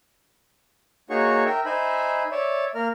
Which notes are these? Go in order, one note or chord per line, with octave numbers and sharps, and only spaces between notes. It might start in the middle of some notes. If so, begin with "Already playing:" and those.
A#3 D#4 F#4 G#4 C#5 C#6
A#4 E5 G5
D#4 C5 E5 G#5 B5
C#5 D5 E5
A#3 A#4 F6